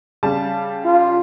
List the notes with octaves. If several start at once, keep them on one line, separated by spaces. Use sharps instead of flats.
C#3 G3 A5
F4